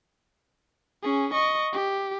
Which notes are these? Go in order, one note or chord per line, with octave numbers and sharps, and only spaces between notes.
C#4 G#4
D#5 C#6
G4